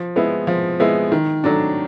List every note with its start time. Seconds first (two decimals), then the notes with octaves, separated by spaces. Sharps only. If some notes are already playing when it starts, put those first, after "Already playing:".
Already playing: F3
0.16 G#3 B3 E4
0.47 F3
0.80 G#3 B3 E4
1.12 D#3
1.44 F#3 A3 D4